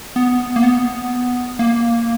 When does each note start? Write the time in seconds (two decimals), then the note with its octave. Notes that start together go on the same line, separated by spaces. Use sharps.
0.16 B3
0.56 A#3
0.63 B3
1.59 A#3